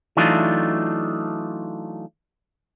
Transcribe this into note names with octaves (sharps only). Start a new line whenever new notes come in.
E3 F#3 A3 D4 D#4 F4